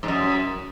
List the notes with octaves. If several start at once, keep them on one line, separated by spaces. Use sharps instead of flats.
G#2
F#2